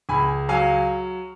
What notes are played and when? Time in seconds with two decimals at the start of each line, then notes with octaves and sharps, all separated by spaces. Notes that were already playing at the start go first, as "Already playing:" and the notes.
0.09 C#2 G#5 B5
0.49 F#3 F5 G#5